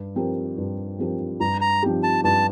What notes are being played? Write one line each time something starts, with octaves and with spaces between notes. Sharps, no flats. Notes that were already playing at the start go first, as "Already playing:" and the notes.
Already playing: G2
F3 C4 G4 A#4
G2
F3 C4 G4 A#4
G2 A#5
A#5
F3 C4 D#4 G4
A5
G2 A5